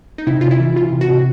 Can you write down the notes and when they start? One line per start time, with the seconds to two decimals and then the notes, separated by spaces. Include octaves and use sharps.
0.18 D#4
0.27 C3 E4
0.41 C3 F4
0.51 E4
0.60 E3
0.76 E3 F4
0.92 C3
1.01 F#4
1.10 C3